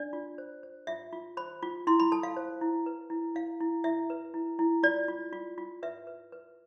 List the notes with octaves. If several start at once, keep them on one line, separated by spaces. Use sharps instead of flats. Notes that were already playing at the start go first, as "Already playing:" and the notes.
Already playing: D4 D5
F4
C5
C5
F4 E5
F4
C5 B5
F4
E4 C6
B5
A4 A5
F5
C5
E4
B4
E4
E4 F5
E4
E4 E5
B4
E4
E4
F4 D5
F4
F4
F4
B4 E5
B4
B4